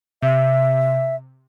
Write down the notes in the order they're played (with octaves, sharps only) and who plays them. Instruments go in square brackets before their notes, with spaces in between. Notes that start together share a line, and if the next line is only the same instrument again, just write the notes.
[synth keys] C3 [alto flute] E5